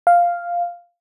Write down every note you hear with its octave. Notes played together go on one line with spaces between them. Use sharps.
F5